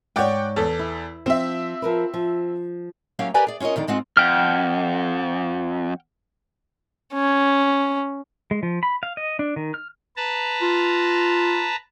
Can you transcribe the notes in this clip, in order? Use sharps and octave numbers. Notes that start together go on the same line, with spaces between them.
G#2 C#5 D5 F#5 G5
E2 A4
E4
F3 C4 E5
F3 A#4 B4
F3
F#3 A#3 C#4 G4 C#5 F5
G4 A#4 B4 D5 G#5 A#5
G#4 D5
C#4 F4 A#4 C#5 D#5
F2 D3 D#3 D5
G#2 G#3 C4 F4 F#5
F2 F#5 G5 F6
C#4
G#3
F3
B5
F5
D#5
D4
D#3
F6
B4 A5 A#5
F4